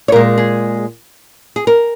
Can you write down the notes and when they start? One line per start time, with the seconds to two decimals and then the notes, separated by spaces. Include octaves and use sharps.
0.08 C#5
0.12 A#2 G#3 A#4
0.38 G#4
1.56 G#4
1.67 A#4